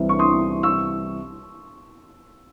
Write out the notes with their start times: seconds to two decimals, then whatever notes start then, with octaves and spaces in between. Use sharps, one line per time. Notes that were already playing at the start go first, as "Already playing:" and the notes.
Already playing: C2 C3 E3
0.09 C#6
0.19 C6 D#6
0.63 C#6 E6